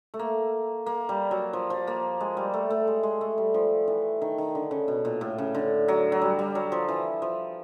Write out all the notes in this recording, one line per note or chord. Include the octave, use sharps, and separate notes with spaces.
A3
A#3
A#3
G3
F#3
F3
F3
A#3
G#3
G3
A3
A3
G#3
G#3
A3
G3
F3
E3
D#3
D#3
D3
C#3
B2
A#2
A2
C#3
D3
F#3
F#3
G3
G3
F#3
F3
E3
F3